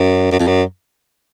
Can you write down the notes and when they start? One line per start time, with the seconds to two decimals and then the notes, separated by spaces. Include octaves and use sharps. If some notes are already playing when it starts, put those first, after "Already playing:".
Already playing: F#2
0.32 F#2
0.39 F2
0.47 F#2